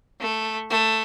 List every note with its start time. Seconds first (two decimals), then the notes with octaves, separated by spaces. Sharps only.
0.20 A3
0.70 A3